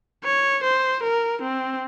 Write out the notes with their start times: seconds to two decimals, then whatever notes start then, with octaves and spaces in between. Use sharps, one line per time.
0.24 C#5
0.64 C5
1.03 A#4
1.42 C4